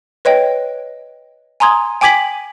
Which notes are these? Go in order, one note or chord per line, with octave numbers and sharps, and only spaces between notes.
B4 C#5 D#5 G5
G#5 A#5 C6 D#6 G#6
G5 G#5 D6 G#6 B6 F#7